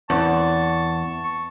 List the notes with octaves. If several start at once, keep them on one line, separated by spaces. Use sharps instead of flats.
E2 A5 C#6